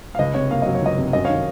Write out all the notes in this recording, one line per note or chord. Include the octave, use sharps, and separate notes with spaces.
F5
C#2 D#5
C3 C#5
A#3 F5
F#3 D#5
C#5
C#2 D#5
C3
F#2 D#5
C#5 F5
D#3